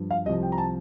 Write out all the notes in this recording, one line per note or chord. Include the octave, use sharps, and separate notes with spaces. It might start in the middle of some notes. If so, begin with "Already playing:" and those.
Already playing: G2 F3
F5
C2 C3 F3 D#5
G5
A#5
A5